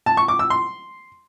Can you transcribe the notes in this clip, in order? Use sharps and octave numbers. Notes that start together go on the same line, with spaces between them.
A5
C#6
D6
E6
C6